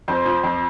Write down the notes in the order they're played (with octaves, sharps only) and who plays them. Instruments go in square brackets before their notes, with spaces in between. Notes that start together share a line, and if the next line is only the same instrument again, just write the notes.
[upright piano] F2 [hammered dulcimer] C5
[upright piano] F3
F2